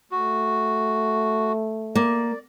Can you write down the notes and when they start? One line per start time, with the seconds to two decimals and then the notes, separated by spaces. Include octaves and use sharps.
0.11 A3 F#4
1.95 A#3 D5